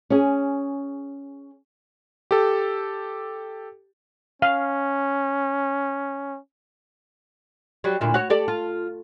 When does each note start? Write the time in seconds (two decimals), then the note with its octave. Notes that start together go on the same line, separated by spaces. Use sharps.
0.10 C#4 G#4
2.31 G4 A4
4.42 C#4 F5
7.84 F#3 G3
8.01 D2 A#2 E4
8.14 F#4 C#5
8.30 G4 A4 D5
8.48 F4